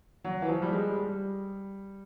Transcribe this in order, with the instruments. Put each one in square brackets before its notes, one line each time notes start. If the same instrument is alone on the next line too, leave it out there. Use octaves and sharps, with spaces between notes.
[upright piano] F#3
E3
F3
G3
G#3
G3